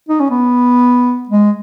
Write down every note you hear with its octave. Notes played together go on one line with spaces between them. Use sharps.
D#4
C#4
B3
G#3